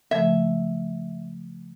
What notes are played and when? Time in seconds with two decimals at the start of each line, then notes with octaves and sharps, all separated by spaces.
0.11 C#3 F3 A3 E5